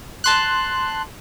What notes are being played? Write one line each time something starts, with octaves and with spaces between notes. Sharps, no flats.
A5 C6 F#6